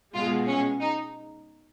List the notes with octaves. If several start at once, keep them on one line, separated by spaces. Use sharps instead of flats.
B2 G#3 F4
C#4
D#4